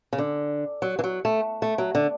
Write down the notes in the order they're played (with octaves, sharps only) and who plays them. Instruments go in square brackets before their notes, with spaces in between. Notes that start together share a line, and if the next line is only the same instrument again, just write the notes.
[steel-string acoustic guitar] C#3
D3
F#3
E3
F#3
A3
A3
F#3
D3